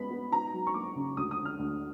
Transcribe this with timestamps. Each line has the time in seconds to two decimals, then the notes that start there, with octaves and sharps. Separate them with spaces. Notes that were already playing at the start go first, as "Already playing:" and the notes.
Already playing: G#3 B3 B5
0.11 B3
0.32 D#4 A#5
0.53 F#3
0.67 C#6
0.74 A#3 D6
0.96 C#3
1.17 D2 D#6
1.31 D#6
1.38 D3
1.45 F6
1.59 D2